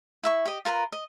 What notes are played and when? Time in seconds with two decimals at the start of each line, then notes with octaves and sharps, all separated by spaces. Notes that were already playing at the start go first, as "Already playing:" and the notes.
0.23 E4 E5 C#6
0.45 G4 D#5
0.65 F4 A#4 B4 A#5
0.92 D#5